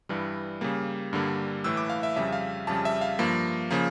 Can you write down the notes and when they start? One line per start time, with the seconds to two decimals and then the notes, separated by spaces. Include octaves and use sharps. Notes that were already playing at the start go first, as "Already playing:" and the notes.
0.09 G2 E3 G3
0.61 C#3 G3 A#3
1.13 G2 D3 G3 A#3
1.64 A2 E3 A3 E6
1.77 D6
1.90 F5
2.03 E5
2.16 F2 C#3 G3 E5
2.33 F5
2.67 F2 C#3 G3 A5
2.85 E5
3.01 F5
3.19 G2 F3 A#3
3.71 C#3 F3 A#3